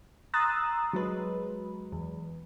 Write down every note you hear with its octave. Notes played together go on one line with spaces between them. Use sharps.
A#5 C6 D#6 E6 F#6 A6
F#3 G#3 B4
E2